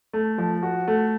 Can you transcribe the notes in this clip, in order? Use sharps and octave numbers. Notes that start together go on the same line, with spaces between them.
A3
F3
F#4
A3